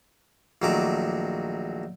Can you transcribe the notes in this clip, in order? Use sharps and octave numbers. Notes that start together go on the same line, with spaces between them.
A#1 D#3 F#3 A3 D6